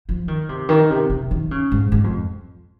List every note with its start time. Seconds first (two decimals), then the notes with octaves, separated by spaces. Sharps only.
0.09 F3
0.28 D#3
0.49 C3
0.69 D#3
0.90 C3
1.10 C3
1.31 D#3
1.51 C#3
1.71 G#2
1.92 G#2
2.04 F2